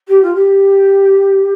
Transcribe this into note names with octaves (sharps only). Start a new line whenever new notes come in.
G4
F4
G4